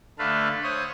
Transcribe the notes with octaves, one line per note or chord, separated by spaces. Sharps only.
D3 A3 A4 B4 F5
C5 C#5 D#6